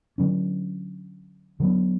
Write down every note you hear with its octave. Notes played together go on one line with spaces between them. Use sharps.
D3 F#3 C#4
D3 F#3 B3